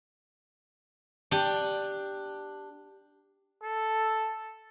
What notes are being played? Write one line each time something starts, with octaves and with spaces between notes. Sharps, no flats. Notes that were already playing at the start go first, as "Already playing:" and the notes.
D4 G4
A4